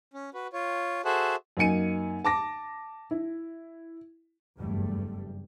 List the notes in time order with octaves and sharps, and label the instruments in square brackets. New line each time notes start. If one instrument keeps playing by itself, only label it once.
[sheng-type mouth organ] C#4
F#4 B4
F4 C#5
F#4 G#4 A4 C5 E5 F#5
[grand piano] F#2 A#3 D#4 G#5 C#7 D#7
A5 D6 A#6
E4
[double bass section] F#1 E2 G2 G3 A3